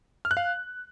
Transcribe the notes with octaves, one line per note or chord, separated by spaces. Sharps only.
F6
F#6
F5